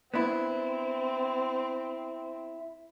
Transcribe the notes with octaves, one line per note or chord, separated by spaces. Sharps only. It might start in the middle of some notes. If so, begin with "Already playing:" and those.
B3 C4 D4 E4